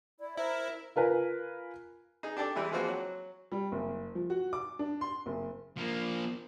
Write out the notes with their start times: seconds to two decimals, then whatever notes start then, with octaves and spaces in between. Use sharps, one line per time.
0.20 E4 D5
0.37 E4 A#4 C5 E5
0.96 F4 A#4 B4 G#5
2.23 D#4 G#4
2.37 D4 G4 A4 D5
2.56 E3 G3 G#3 E4
2.71 E3 F3 G#3 A#3 C4 F#4
2.88 F#3
3.52 G3
3.72 F#1
4.15 F3
4.30 F#4
4.53 D6
4.79 D4
5.01 C6
5.26 F#1
5.77 F3 A#3